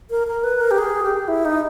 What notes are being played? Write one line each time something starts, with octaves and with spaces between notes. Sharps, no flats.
A#4
A#4
B4
A#4
G4
G#4
G4
E4
D#4